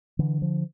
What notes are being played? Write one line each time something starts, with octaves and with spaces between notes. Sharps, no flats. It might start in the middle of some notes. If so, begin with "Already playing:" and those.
D3 E3
F3